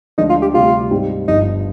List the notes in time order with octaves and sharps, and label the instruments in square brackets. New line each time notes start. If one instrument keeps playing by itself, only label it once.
[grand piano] D2 D3 F3 G#3 D4 [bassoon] D#4
[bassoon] F4
G4
[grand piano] D2 C3 G3 [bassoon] F4
[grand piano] G#2 G3 C4 D#4
[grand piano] G1 G2 F3 [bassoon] D#4